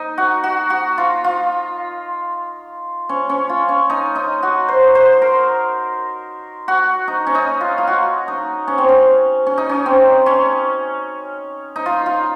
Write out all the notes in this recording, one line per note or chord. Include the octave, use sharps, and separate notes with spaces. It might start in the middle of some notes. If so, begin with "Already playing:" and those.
Already playing: D#4
F#4
F#4
F#4
F4
F4
C#4
C#4
F4
C#4
D#4
D#4
F#4
C5
C5
A#4
F#4
D#4
C#4
D#4
F4
F4
F#4
D#4
C#4
C4
C#4
C#4
D#4
C#4
C4
C#4
D#4
F4
F4